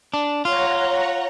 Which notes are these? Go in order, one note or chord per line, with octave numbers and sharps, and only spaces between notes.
D4
F4 C#5 F#5 A#5